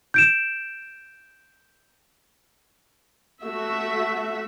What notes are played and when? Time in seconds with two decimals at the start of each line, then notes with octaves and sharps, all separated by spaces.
0.14 G6 D7 E7
3.43 A3 F#4 E5